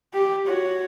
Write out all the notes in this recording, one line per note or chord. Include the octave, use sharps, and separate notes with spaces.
G4
F#4 C#5